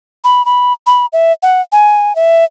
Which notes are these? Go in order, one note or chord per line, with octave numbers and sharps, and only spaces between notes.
B5
B5
B5
E5
F#5
G#5
E5